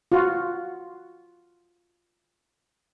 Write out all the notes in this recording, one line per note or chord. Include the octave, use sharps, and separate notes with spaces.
F4 F#4